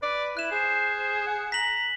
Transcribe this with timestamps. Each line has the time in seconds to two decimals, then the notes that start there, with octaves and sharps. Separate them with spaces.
0.03 B4 D5
0.37 E4 F#6 E7
0.51 G#4 C5
0.98 C5
1.27 F#5
1.52 A#5 B6 F#7